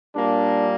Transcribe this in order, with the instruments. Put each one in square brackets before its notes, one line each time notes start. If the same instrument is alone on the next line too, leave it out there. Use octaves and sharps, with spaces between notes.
[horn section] A#2 G3 A#3 D4